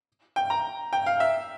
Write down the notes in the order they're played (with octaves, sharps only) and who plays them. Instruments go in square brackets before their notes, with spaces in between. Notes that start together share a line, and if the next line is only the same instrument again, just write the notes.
[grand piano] G5
A#5
G5
F5
E5